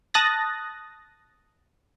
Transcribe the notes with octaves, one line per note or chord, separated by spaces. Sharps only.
A5 D#6 F#6 A6 A#6